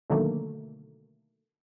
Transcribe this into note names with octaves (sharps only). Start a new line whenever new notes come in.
B2 D3 D#3 F#3 A3 A#3